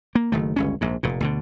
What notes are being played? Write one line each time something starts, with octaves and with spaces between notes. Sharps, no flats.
A#3
F#1 D#3 A3
G1 C#2 C#4
A#1 G#2
F1 A#2
D2 B2 D3